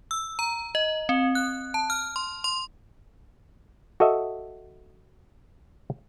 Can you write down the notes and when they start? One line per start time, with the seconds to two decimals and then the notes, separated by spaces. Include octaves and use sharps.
0.11 E6
0.39 A#5
0.75 D#5
1.09 C4
1.35 F#6
1.74 A5
1.90 F6
2.16 C6
2.44 C6
4.00 F#4 A4 D#5 E5